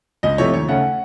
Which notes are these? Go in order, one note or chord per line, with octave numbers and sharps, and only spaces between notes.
C#2 D#5
C3 F3 A3 C#5
D#2 C#5
C#3 A3 C#4 F#5